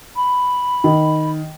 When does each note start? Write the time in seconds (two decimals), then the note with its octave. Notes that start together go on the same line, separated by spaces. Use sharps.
0.15 B5
0.84 D#3